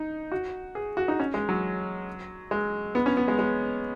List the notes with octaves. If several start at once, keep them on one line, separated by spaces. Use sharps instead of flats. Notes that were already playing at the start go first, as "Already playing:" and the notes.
Already playing: D#4
F#4
G#4
F#4
D#4
C#4
G#3
F#3
G#3
B3
C#4
B3
G#3
G#3